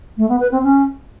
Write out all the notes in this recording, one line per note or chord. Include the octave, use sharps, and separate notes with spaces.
A3
B3
B4
C4
C#4